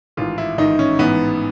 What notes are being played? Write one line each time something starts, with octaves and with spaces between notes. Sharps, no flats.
A1 G#2 D#3 F4
E4
A1 G#2 D#3 D#4
C#4
A1 G#2 E3 B3